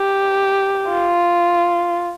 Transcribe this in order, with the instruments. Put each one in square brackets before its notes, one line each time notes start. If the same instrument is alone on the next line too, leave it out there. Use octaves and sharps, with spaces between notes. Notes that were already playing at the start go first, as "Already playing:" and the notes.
Already playing: [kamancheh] G4
F4